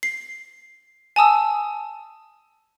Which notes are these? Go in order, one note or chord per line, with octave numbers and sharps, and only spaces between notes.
C7
G#5 A5 D#6 E6